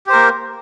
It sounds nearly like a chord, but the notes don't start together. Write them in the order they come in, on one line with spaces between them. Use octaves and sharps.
G4 C5 A#4 A#3